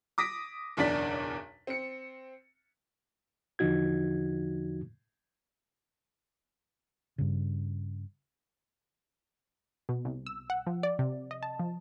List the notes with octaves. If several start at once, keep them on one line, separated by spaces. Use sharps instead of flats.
D6 D#6 A#6 B6 D7
F#1 B1 E2 D4 D5 B6
C4 C#7
E2 D3 F3 D#4 F#4 G#6
G2 C#3
B2
C2
E6
F#5
F3
D5
C3
D#5
A5
F3